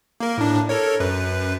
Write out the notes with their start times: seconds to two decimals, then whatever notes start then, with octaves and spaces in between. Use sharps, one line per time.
0.20 A#3 A#4
0.38 A2 D4
0.69 A4 A#4 C#5
1.00 F#2 B4